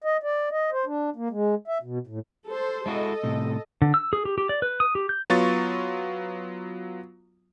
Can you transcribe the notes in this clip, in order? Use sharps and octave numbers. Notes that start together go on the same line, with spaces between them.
D#5
D5
D#5
C5
D4
A#3
G#3
E5
B2
A2
A4 C5
G#3 E4 F#4 A4 D#5
A2 C3
D3
E6
G#4
G4
G4
D5
B4
D#6
G4
G6
F#3 B3 F4 C#6 A6